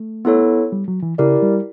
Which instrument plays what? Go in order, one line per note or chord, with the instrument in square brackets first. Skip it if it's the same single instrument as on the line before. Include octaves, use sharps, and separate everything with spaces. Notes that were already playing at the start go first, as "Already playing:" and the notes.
Already playing: [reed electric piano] A3
[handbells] B3 E4 A4 C#5
[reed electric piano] G3
F#3
E3
[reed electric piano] C#3 [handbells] E4 G4 A#4 D5
[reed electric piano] G3